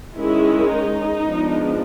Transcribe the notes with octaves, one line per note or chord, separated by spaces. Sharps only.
D#3 G#3 C#4 E4
D#4
F3 G#3 B3 D4